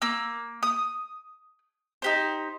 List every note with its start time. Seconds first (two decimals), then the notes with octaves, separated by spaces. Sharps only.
0.02 A#3 E6
0.63 D#6
2.02 D#4 G4 C5